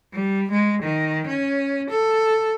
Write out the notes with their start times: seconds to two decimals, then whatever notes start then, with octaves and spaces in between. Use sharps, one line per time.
0.13 G3
0.51 G#3
0.83 D#3
1.27 C#4
1.90 A4